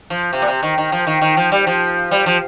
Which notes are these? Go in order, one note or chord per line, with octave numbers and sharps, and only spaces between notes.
F3
C3
A#2
C3
D#3
D#3
F3
D#3
D#3
F3
G3
F3
G3
F3